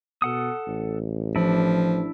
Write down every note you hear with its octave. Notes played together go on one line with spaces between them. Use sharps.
B2 A4 F#5 D#6
A1
F3 D4 E4